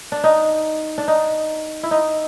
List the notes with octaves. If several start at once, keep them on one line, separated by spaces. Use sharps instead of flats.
D4
D#4
D4
D#4
E4
D#4